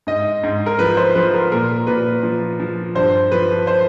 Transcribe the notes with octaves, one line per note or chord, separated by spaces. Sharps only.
G#2 D#5
G#2
A#4
F3 B4
C5
F3 B4
A#4
A#2 A#4
A#2 B4
F3
F3
G2 C5
F3 B4
C5